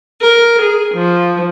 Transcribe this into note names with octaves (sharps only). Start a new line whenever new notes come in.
A#4
G#4
F3